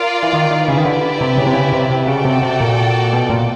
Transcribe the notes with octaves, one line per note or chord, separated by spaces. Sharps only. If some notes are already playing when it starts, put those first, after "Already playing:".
Already playing: F4 A#4 D5
E3
D#3
D#3
C#3 E4 G4 B4 D5
D#3
D3
C3
C#3
C3
C#3
C3
C3
C#3 F#4 A4 D5 G5
C3
C3
A#2
B2
A#2